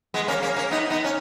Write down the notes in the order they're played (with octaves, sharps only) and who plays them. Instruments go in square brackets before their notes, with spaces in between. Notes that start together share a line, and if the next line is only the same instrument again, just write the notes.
[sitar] G#3 B3
A#3 C#4
A#3 C#4
A#3 C#4
B3 D#4
B3 D#4
C#4